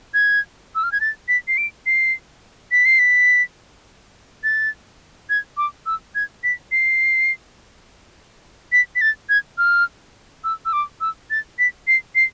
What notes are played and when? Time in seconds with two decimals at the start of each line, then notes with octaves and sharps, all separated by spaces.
0.14 G#6
0.75 E6
0.83 F6
0.92 G#6
1.01 A6
1.28 B6
1.48 C7
1.58 D7
1.86 C7
2.72 B6
2.85 C7
2.99 B6
4.44 A6
5.30 G#6
5.57 D6
5.86 E6
6.15 G#6
6.44 B6
6.72 C7
8.72 B6
8.96 B6
9.01 A6
9.29 G#6
9.58 F6
10.44 E6
10.65 E6
10.73 D6
11.01 E6
11.30 A6
11.59 B6
11.87 C7
12.15 C7